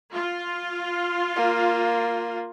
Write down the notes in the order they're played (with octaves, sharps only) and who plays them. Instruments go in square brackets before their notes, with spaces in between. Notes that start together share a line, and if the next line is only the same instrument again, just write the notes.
[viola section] F4
[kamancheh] A#3